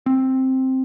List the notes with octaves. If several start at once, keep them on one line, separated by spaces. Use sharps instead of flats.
C4